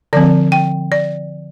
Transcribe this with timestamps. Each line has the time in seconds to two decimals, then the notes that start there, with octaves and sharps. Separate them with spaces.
0.13 D3 F3 C4 D5
0.52 G5
0.92 D5